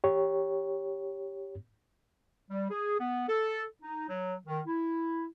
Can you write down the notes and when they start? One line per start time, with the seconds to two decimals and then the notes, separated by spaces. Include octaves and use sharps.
0.04 G4 C#5
2.49 G3
2.70 G#4
2.99 B3
3.29 A4
3.83 D#4
4.09 F#3
4.47 D#3
4.67 E4